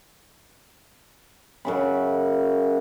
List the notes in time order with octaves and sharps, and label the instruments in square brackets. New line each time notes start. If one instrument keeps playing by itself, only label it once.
[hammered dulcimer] F#2 C#3 B5